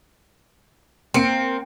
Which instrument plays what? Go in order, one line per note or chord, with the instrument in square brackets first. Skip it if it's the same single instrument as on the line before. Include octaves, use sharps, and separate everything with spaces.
[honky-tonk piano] A#3 C#7 D7 [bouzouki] C4